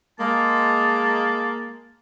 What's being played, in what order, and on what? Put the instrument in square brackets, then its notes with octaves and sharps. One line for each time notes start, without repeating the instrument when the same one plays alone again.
[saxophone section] G#3 A#3 [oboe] A5